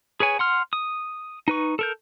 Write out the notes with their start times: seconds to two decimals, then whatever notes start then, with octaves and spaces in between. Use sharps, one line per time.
0.20 G#4 B4 C#5 G#5
0.39 F#5 C6 F6
0.73 D#6
1.48 D#4 B4 C#6
1.79 A4 A#4 G6